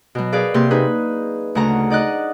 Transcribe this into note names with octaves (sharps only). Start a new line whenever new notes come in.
B2 F#3
G#4 A#4 B4 D5 F5
C3 A#3 C6
D#4 G#4 B4
D2 C#3 F#5 A#5
D#4 D5 D#5 F#6